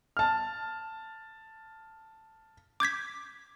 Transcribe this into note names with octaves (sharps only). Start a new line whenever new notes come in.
A5 F6
D6 G6 G#6 B6